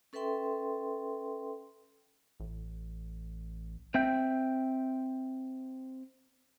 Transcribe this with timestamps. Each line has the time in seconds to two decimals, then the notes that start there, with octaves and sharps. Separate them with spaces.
0.13 C#4 A4 B4 E5 G5 C6
2.40 A1
3.95 C4 E5 G5